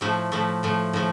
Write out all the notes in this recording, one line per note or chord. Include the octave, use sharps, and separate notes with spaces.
A2 F3 A3
A2 F3 A3
A2 F3 A3
A2 F3 A3